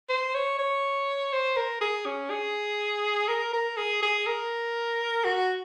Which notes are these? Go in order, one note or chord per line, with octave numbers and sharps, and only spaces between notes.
C5
C#5
C#5
C5
A#4
G#4
C#4
G#4
A#4
A#4
G#4
G#4
A#4
F#4